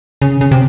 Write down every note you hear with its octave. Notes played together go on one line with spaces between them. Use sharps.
C#3
C#3
C3